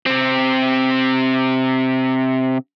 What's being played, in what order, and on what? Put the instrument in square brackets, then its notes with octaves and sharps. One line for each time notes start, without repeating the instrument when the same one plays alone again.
[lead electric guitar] C3 C4